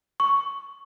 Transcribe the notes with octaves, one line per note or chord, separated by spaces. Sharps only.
C#6